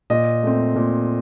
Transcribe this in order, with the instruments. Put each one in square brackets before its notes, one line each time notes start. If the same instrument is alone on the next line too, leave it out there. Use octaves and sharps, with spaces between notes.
[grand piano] A#2 D#5
A3 C4
A#2